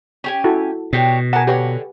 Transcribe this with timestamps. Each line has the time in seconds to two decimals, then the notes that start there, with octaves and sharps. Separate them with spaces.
0.24 C#4 G4 G#5
0.44 E4 F#4 A4
0.93 B2 D4 G4 C#5
1.33 A#4 F#5 G#5 A5
1.47 D3 G4 B4 C#5 F#5